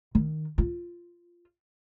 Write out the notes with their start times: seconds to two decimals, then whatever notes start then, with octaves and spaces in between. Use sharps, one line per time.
0.15 D#3
0.58 F4